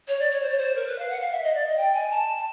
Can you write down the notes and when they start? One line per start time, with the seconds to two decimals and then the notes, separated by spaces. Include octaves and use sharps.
0.08 C#5
0.20 D5
0.31 C#5
0.42 C5
0.50 C#5
0.58 C5
0.75 A#4
0.87 B4
0.98 F5
1.10 F#5
1.21 F5
1.32 E5
1.43 D#5
1.54 D5
1.66 D#5
1.77 G5
1.94 G#5
2.11 A5
2.36 A5